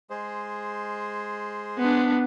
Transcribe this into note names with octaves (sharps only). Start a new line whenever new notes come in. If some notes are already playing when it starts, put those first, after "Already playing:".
G#3 G#4 C5
B3 D4